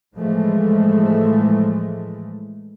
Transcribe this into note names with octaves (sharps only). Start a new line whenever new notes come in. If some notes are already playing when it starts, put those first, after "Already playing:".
A2 E3 F3 G#3 A3